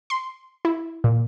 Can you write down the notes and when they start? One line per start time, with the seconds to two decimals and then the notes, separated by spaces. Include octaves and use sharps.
0.10 C6
0.65 E4
1.04 A#2